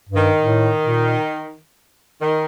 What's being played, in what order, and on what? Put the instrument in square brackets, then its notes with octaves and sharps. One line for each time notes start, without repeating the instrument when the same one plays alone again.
[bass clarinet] G2
[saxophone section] D#3
[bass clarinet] A2
A#2
[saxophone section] D#3